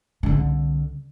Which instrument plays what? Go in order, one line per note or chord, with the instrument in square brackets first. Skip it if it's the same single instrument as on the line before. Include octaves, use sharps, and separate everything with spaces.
[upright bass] C2 D3